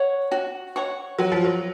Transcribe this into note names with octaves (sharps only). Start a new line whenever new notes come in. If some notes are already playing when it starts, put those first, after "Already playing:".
Already playing: C#5 F#5 C#6
F#4
C#5 F#5 C#6
F#3 F#4
F3
F#3